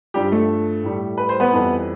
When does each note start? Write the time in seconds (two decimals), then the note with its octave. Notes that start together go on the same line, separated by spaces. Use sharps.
0.14 G2 F3 G3 G4
0.32 A3 A4
0.83 A2 G3
1.18 B4
1.29 C5
1.40 B3 B4
1.53 F2 E3 G3